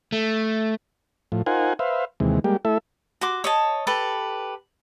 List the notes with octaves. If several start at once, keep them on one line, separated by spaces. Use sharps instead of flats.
A3
A2 F3
D#4 F4 A#4 C5 F#5 G#5
B4 C5 E5 F5
D#2 C3 E3 G#3
G3 G#3 A#3 G4
A3 E4 A4 E5
F#4 C6 D6
C#5 D#5 A5
G4 A4 B4